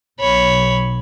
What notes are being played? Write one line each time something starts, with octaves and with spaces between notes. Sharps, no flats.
B1 C#5 B5